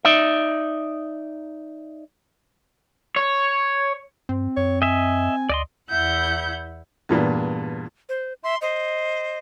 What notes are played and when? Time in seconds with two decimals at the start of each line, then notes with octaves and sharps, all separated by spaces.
0.05 D#4 D5 E5
3.16 C#5
4.29 G2 C4
4.57 F#2 C#5
4.82 D#5 E5 G#5
5.49 D2 D5 D#5 C6
5.88 E2 E4 E5 F#5 G6
7.09 E2 G2 A#2
8.09 C5
8.43 E5 C6
8.61 C5 D#5